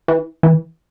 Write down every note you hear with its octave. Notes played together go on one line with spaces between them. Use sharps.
E3
E3